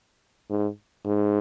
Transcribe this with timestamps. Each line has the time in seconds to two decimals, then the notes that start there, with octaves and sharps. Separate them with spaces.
0.50 G#2
1.06 G#2